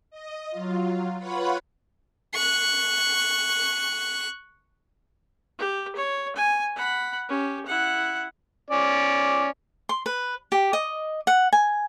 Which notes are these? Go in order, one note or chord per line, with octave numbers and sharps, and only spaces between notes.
D#5
F#3 F4
F4 B4 C#5 F#5 B5
C#6 F#6
G4
C#5
G#5
F#5 B5
C#4 G4
E4 F#5
C#4 D5
C6
B4
G4
D#5
F#5
G#5